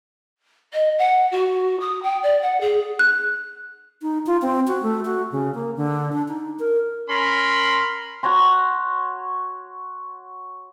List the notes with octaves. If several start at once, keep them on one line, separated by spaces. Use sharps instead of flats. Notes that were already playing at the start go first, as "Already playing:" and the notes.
D#5
F#5
F#4
D#6
G5
D5
F#5
G#4
F#6
D#4
F4
C4
F#4
A3
F#4
C#3
A#3
D3
D4
D#4
A#4
C#4 A#4 B5 C6
F#4 C#5 A#5 C6